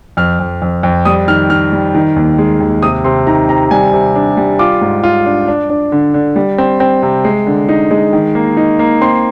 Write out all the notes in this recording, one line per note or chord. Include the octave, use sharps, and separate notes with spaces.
F2 F6
F2
F2
F2
G3 D#6
D#3 F6
D#3 F6
G3
D#3
D#2
G#3
D#2
C3 D#6
C3 C6
D#3 A#5
C3 A#5
G3 G#5
C3
D4
G3
F4 D6
G#2
F4
D4
D4
D4
D3
D3
G3
C4
C4
C3
G#3
D3
D#4
G#3
D#3
A#3
D#4
A#3
C4 C6